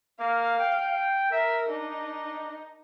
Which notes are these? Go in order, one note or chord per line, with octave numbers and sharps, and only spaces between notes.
A#3 F5
G5
A#4 E5
D4 D#4